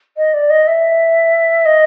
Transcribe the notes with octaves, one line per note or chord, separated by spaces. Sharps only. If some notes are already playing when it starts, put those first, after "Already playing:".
D#5
D5
D#5
E5
D#5